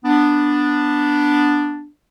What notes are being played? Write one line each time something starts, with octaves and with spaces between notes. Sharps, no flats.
B3 D4